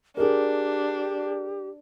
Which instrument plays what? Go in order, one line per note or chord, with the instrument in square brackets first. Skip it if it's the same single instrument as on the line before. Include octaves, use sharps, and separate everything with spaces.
[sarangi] D4 [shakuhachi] G4 [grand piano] G#4 A#4